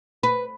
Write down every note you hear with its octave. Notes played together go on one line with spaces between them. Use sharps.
B4